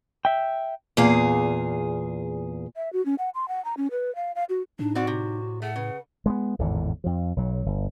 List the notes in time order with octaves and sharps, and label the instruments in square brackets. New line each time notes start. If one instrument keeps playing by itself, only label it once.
[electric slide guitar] E5 G5
[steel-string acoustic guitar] E2 A#2 G#4 F5
[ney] E5
F#4
C#4
F#5
C6
F#5
A#5
C#4
B4
F5
F5
F#4
[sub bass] A2 [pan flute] D4 [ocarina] D#4
[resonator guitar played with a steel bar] C4 D5 F#5 [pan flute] F#4
[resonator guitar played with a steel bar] C3
[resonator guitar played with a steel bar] A3 [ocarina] G#4 [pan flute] F#5
[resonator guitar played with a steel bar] C#3 [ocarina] B4
[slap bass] G#3 A#3 B3
G#1 E2 A2 D3
F2 F3
B1 F#3
G1